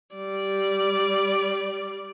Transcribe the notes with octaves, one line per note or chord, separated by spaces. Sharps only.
G3 D5